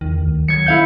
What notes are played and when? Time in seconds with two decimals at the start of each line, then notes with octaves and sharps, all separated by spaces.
0.01 E2 D#3
0.21 D2
0.48 F#3 G#6 C#7
0.66 E4 F5 G6